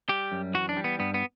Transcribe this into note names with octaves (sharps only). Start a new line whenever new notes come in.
G3 G4
F#2
E3 F#4
D4
G3
B3
G2 B3
B3